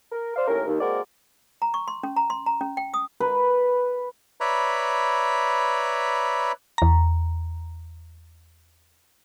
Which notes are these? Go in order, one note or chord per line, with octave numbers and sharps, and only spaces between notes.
A#4
C5 D5 F5
D#2 A2 C#4 A#4
D#2
G#3 A#3 C4 F#4 A#4 D5
A#5
C#6
C6
C#4
A#5
C6
A#5
C#4
G5
D#6
B4
B4 C#5 D5 E5 A#5 B5
E2 A#5